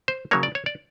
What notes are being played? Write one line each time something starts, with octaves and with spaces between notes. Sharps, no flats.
C5
C#3 F#3 A#3 C#5
D5
C#5
D5